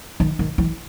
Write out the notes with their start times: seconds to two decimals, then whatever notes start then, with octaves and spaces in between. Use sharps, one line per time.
0.20 D#3
0.39 D#3
0.58 E3